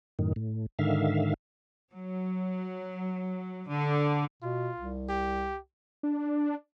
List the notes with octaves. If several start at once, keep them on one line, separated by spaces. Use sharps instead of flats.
F#2 A2 D#3
A2
G#2 D3 D#3 E5 F5
F#3
D3
B2 F4
C2
G4
D4